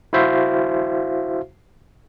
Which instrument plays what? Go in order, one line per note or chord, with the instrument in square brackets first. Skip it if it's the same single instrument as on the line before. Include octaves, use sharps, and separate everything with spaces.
[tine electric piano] E4 F#4 C5 E5 F5